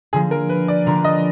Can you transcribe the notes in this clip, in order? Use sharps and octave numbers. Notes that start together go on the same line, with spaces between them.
D3 F3 A#3 G#4
A#4
B4
D5
D3 F3 A#3 A#5
D#5